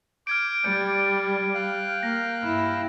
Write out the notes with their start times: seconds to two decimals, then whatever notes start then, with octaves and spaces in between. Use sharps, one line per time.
0.27 D6 F6 G6 G#6 D7
0.64 G3 D5 G6 C#7 D7
1.54 F5 G5 F#6
2.03 A#3 A#6
2.43 G2 E4